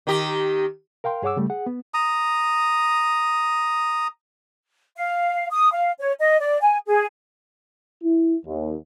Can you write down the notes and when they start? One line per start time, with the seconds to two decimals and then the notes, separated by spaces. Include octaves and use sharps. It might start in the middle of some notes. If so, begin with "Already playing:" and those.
0.07 D#3 D#4 G4
1.04 A#4 F5 G5 C6
1.22 G2 G#4 C#5 F#5 D6 E6
1.37 C#3 G3 A3
1.50 G#4 F#5
1.66 B3
1.94 A#5 D#6
4.96 F5
5.51 D#6
5.72 F5
5.99 C#5
6.20 D#5
6.40 D5
6.61 G#5
6.87 G#4
8.02 E4
8.46 D#2